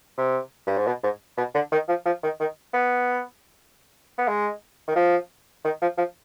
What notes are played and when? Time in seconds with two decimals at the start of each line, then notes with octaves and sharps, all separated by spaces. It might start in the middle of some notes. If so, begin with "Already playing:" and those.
0.18 C3
0.67 G2
0.77 G#2
0.86 B2
1.03 G#2
1.37 B2
1.54 D3
1.72 D#3
1.88 F3
2.06 F3
2.23 D#3
2.40 D#3
2.73 B3
4.18 B3
4.28 G#3
4.88 D#3
4.96 F3
5.64 D#3
5.82 F3
5.97 F3